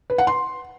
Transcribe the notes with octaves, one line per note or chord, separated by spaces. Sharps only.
B4
F#5
C6